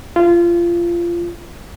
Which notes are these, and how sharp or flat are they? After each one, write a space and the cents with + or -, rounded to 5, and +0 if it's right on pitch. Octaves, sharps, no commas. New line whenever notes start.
F4 -25